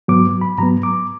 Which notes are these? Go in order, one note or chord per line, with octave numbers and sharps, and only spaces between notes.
G#2 F#3 B3 D6
B5
G#2 F#3 B3 A#5
D6